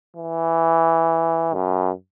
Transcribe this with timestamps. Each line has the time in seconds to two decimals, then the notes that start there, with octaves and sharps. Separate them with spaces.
0.17 E3
1.54 F#2